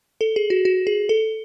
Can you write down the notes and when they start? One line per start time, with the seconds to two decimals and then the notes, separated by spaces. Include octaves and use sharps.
0.21 A4
0.36 G#4
0.50 F#4
0.65 F#4
0.87 G#4
1.09 A4